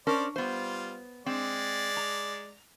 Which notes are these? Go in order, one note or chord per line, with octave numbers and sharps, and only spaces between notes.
C#4 D4 A#4 C5 D5
G3 B3 F4 C5
G#3 C4 D5
A#5